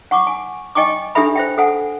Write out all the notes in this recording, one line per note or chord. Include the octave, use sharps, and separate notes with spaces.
F#5 C#6 D6
G#5
D#5 G5 G#5 C#6 D6
D4 G4 A4 E5 B5
C5 E5 G5
A4 F#5 G#5